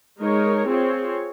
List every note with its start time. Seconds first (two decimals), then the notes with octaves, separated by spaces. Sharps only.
0.20 G#3 D#4 A#4 C#5
0.65 C4 F4 G#4 C#5